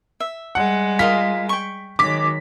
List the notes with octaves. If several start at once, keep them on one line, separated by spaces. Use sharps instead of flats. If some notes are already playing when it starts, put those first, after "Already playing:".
E5
G3 G#3 F#5
F4 A#4 D#5 B6
G5 C#6
D#3 F#3 G#3 D6 B6